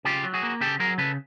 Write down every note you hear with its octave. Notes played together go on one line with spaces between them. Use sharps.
C#3 F4 G4
F#3
F#4 G#4
A#3
C#3 G4 A4
F#3 G#4 A#4
C#3 A4 B4